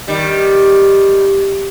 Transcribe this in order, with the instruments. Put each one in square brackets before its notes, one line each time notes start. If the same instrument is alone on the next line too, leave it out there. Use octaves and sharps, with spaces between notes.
[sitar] D#3 G3